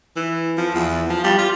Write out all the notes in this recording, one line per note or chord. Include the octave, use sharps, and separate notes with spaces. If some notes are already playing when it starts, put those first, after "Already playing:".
E3
F3
E2
F3
G3
F4